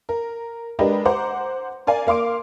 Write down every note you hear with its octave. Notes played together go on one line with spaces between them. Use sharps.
A#4
G#3 D4 G4 A#4 B4 D#5
C5 F#5 A#5 D6
A#4 D5 F5 G#5
A#3 F5 C6 D6 D7